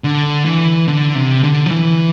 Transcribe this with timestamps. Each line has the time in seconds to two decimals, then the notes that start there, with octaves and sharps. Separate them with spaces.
0.04 D3
0.46 E3
0.88 D3
1.15 C3
1.44 D3
1.66 F3
1.71 E3